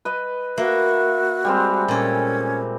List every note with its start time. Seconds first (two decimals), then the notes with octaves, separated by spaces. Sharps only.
0.05 B4 D#5
0.58 A#3 F#4 E5
1.45 G3 G#3 C4
1.88 A#2 C#4 A4